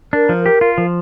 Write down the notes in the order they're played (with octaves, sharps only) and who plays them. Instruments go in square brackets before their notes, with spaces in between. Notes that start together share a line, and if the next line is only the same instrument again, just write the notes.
[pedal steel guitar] D4 [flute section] A#4
[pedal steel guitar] F3
G4
F4
F3